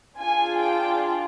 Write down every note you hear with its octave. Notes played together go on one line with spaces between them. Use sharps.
D4 F4 G#4 G#5
G5